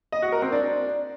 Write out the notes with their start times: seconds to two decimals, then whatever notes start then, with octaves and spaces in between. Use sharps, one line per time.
0.12 D#5
0.22 F#4
0.32 A#4
0.42 C4
0.52 D4